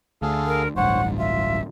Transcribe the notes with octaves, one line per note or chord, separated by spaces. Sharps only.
D2 G#4 A4 F5
A#4
D1 A1 G2 C5 C#5 F#5
F4 E5